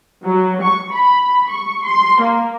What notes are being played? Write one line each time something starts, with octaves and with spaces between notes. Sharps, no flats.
F#3
C#6
B5
C#6
C6
A#3